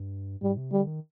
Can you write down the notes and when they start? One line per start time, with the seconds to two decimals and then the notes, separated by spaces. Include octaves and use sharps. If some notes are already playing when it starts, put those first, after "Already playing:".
Already playing: G2
0.42 G#2 G3
0.57 C3
0.72 D3 G3
0.86 D#3